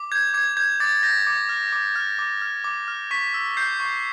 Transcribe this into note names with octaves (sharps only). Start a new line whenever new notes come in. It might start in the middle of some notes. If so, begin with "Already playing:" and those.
Already playing: D6
G6 G#6
D6 G#6
G6 G#6
D6 A6
G6 A#6
D6
F6
D6
F6
D6
F6
D6
F6
C#6 B6
E6
G6 C7
C#6